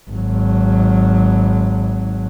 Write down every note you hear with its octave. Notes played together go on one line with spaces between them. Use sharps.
G#1 F#3